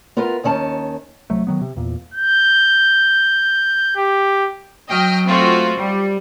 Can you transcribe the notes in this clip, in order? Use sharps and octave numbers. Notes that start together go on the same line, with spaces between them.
B3 E4 F4 A#4 B4
D#2 D#3 C#4 A5
C2 F#3 A3
D#3 F#3 B3
C3
E2 A#2
G6
G4
F#3 D#5 G5 F6
A3 C4 F4 F#4
G3